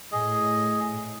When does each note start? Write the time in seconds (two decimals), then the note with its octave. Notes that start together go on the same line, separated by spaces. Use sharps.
0.12 A2 G#4 D#5